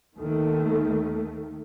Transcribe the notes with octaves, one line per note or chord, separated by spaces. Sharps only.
D#2 D#3 A3